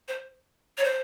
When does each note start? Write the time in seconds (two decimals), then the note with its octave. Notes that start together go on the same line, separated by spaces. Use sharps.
0.08 C5
0.78 C#5
0.84 C5